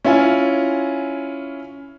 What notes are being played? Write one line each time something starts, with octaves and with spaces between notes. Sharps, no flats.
C#4 E4 F4 G#5